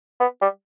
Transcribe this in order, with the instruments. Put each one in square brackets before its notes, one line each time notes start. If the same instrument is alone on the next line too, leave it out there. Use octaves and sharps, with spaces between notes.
[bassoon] B3
G3